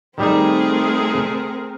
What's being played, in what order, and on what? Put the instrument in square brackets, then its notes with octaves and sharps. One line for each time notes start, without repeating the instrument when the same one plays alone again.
[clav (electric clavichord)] D#3 G3 D#4 [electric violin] A3 G#4 [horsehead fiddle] C4 A#4